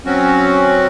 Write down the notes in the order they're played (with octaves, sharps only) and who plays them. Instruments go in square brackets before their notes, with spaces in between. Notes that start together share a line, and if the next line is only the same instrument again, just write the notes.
[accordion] F#3 C4 C#4 F#4